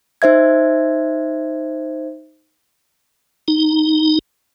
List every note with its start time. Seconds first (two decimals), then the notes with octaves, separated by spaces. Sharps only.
0.22 D#4 C5 E5 G#6
3.48 D#4